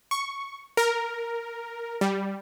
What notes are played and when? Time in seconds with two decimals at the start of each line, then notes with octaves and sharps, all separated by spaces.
0.11 C#6
0.77 A#4
2.01 G3